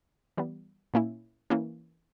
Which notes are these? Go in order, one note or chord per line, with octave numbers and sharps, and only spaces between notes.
E3 G3 B3
A#2 A#3 C#4 E4
E3 A#3 C#4